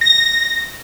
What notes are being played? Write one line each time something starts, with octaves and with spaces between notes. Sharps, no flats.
A#6